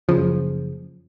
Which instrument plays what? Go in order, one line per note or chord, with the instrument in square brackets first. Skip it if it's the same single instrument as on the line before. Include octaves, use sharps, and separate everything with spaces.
[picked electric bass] F#1 C#3 F3